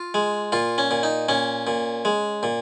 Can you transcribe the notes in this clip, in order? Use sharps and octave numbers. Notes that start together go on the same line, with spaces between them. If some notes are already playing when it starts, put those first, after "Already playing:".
Already playing: F4
G#3
A#2 F4
C#4
A#2
D#4
A#2 C#4
A#2
G#3
A#2